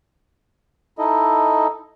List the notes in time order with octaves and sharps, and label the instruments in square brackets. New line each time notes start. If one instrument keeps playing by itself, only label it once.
[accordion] D#4 E4 A4 D#5